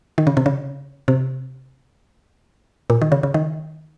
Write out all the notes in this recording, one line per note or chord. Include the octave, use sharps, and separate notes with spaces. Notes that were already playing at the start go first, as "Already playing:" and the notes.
D#3
C#3
C3
C#3
C3
A#2
D#3
C#3
C#3
D#3